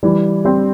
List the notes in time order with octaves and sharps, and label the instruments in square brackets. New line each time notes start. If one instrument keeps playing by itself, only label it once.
[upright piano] E3 [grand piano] G3
[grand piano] G3 [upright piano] C4